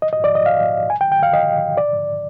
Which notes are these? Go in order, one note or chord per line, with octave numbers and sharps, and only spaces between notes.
D#5
D#5
D5
D#5
F5
G#5
G5
G5
F5
D#5
D5